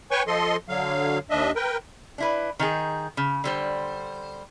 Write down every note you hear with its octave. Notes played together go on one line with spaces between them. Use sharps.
B4 C#5 G5 G#5 C#6
F3 A4 D#5 C6
D3 F#3 F5
D#2 D4 D#5 E5
A#4 B4 G5
D4 E4 B4
D#3 D#4 G#4
C#3
D3 G3 C5